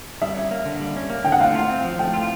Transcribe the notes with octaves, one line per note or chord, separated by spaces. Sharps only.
G3 E5
C#4
A#3
D3
G3
C#4
A#3
D3 G5
F#5
A3 F5
F4
C4
F3
A3 G5
F4